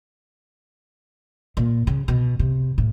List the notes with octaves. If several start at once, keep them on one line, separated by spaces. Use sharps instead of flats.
A#2
C#3
B2
C3
A2